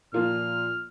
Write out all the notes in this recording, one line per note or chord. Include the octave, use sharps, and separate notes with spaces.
A#2 F3 A#3 F4 F6